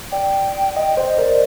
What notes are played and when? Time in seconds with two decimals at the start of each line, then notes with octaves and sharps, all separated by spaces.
0.12 D5 G5
0.76 D#5 G5
0.97 C5 D#5
1.18 A#4 D5